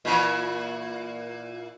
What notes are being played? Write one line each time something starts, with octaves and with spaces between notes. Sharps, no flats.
A#2 E3